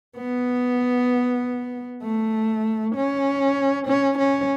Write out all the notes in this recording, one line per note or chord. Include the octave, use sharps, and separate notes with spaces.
B3
A3
C#4
C#4
C#4